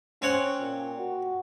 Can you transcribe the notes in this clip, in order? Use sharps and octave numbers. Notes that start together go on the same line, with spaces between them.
C4 C#4 C#5 F#5
A#2
F#4